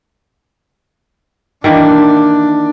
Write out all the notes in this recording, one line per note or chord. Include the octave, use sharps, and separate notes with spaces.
D#3 E3 A#3 D4